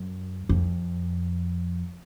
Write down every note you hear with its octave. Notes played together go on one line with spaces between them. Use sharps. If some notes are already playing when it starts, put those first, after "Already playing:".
Already playing: F#2
F2